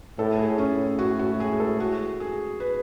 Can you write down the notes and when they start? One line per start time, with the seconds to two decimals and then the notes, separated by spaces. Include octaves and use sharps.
0.19 A2 A4
0.39 G#4
0.58 A2 C#4
0.99 F#4
1.19 F#4
1.40 G#4
1.60 A4
1.80 F#4
2.20 G#4
2.60 B4